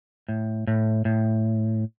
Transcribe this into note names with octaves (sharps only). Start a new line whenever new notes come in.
A2
A2
A2